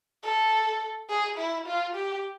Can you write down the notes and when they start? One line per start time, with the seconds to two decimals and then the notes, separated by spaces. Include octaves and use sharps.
0.24 A4
1.09 G#4
1.38 E4
1.67 F4
1.96 G4